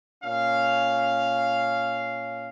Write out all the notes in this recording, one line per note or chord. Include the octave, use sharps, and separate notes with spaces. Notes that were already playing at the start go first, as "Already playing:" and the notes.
A#2 C#4 F5